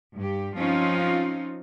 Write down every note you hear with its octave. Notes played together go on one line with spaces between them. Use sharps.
G2 G4
F3 C4 C#4 D#4 F4